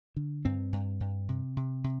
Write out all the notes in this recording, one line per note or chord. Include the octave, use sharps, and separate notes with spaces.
D3
G2 C4
G2
G2
C3
C3
C3